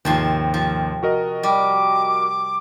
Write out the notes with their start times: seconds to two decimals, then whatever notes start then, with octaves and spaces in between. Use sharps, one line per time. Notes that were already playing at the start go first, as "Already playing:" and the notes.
0.05 D#2 G#2 C3 F3 C6
0.54 F3
1.03 F#4 A#4 D#5
1.43 G3 D6